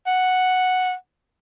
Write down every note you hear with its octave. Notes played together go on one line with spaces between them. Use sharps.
F#5